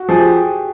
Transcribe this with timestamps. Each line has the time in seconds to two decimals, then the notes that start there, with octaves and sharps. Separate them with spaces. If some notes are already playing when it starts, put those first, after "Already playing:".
Already playing: F#4
0.09 F3 G#4
0.18 G4